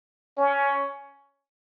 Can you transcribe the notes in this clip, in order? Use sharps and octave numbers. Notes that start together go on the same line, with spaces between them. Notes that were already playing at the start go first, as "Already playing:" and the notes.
C#4